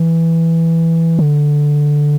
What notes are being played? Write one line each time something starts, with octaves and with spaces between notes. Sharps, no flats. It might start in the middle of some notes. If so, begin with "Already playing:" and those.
Already playing: E3
D3